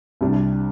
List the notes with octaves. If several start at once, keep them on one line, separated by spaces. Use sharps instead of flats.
C2 C3 G3 D4